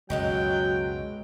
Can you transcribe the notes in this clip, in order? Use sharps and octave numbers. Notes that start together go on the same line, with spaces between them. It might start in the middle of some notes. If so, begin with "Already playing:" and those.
C#2 F#2 B2 F#3 G#3 F4 G5